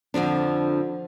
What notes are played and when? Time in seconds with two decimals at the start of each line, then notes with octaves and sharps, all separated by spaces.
0.14 F2 D3 F3 D4